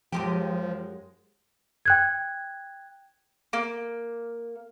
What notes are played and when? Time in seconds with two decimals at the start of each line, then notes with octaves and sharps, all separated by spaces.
0.12 F#2 F3 G#3 G4
1.85 G5 F#6 G#6
3.53 A#3